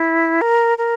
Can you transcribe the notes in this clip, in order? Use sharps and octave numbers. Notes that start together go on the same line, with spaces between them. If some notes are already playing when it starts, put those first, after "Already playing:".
Already playing: E4
A#4
A#4